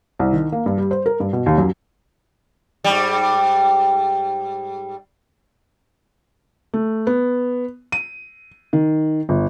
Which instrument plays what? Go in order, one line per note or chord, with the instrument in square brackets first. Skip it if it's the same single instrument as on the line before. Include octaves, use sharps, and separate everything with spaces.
[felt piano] C2
D#3
A#3
G2
G3
C5
A#4
G2
B2
D#2
F#2
[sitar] G#2 G3
[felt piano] A3
B3
D#7
D#3
G1